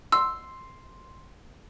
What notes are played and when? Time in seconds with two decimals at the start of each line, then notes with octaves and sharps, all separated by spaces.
0.12 C6 E6